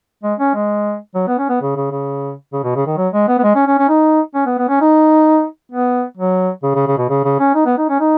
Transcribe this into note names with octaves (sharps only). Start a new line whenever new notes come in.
G#3
C#4
G#3
F#3
B3
C#4
B3
C#3
C#3
C#3
C#3
B2
C#3
D#3
F#3
G#3
B3
B3
G#3
C#4
C#4
C#4
D#4
C#4
B3
B3
C#4
D#4
B3
F#3
C#3
C#3
C#3
B2
C#3
C#3
C#4
D#4
B3
D#4
C#4
D#4